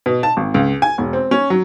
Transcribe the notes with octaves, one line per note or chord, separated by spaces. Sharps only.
B2
A5
G#1
C#2
G#5
E1
C4
C#4
F#3